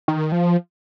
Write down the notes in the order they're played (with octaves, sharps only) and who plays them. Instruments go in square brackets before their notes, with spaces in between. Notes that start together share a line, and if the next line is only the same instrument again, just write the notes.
[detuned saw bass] D#3
F3